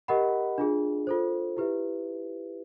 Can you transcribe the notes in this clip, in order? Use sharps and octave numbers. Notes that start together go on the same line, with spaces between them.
G4 A#4 D#5 F#5 B5
D4 F4 G#4
F4 A4 C5
E4 G4 B4 E5